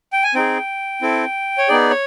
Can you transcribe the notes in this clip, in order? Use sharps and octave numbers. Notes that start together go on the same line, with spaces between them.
G5
G#5
C4 D#4 G#4 G5
C4 E4 A4
C#5
B3 D#4 G#4 D5
C#5